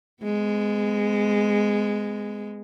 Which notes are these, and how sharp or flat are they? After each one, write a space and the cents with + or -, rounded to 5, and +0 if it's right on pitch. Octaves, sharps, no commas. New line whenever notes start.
G#3 +0 B3 +40